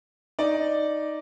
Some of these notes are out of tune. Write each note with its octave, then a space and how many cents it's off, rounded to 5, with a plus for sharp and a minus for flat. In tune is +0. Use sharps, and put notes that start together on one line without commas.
D#4 +0 D5 +0